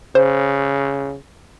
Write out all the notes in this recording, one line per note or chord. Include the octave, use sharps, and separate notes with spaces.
C#3 C5